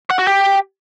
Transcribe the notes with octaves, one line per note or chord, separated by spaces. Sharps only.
F#5
F#4
G4